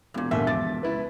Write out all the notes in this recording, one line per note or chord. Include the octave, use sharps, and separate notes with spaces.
E1 G2 A#2
D#2 A#2 D3 E5
F3 D6 A6
C#2 E4 B4